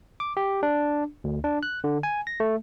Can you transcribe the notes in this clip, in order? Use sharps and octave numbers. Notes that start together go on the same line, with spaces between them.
D6
G4
D4
D2
D4
F#6
D3
G#5
A#6
A3